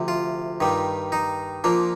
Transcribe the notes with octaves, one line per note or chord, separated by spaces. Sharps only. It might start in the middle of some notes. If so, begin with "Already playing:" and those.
Already playing: D2 C3 F3
F4
G2 D#3 G3
D#4
A#2 F3 A#3 D4